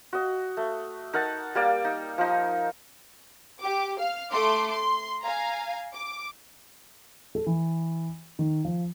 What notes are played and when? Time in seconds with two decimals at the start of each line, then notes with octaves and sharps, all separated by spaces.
0.13 F#4 D#5
0.57 A3
1.13 D#4 A#4 F#5 A5
1.55 G3 A#3 D5
1.85 D#4
2.18 F3 D#4
3.62 G4 D6
4.00 F5 F6
4.32 A3 C6 D6
4.70 C6
5.23 F5 G#5 A#5
5.93 D6
7.35 A4
7.47 E3
8.39 D#3
8.65 F3